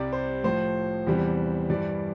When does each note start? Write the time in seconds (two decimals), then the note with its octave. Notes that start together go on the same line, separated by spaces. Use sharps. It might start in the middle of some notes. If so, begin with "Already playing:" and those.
Already playing: C2 C3 G3 D5
0.13 C5
0.44 A2 F3 C5
1.07 E2 C3 E3 G3
1.70 G2 E3 G3 D5